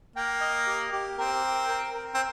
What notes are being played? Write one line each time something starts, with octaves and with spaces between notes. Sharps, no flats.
A#3 G5
D#5
G4
G4
C4 A#4
G5
A#4
A#4
C4